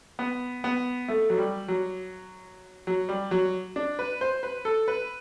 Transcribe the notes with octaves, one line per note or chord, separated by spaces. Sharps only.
B3
B3
A3
F#3
G3
F#3
F#3
G3
F#3
D4
B4
C5
B4
A4
B4